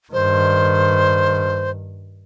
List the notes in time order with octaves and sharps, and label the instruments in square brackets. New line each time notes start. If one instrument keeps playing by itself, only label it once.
[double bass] G2 D#3 [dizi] C5